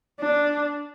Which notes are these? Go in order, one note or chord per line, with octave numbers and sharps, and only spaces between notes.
D4